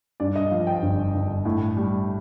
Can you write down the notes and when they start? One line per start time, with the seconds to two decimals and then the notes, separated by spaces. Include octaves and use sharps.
0.20 G2 D5
0.36 D#5
0.51 F3 F5
0.67 G5
0.82 G1
1.14 G1
1.45 A2
1.77 G3